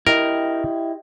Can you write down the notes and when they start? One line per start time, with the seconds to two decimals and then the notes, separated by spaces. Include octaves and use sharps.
0.07 E4 G4 A#4 D#5